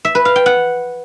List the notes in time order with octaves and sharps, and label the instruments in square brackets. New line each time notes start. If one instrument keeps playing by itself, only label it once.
[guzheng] E5
B4
F5
G5
F#5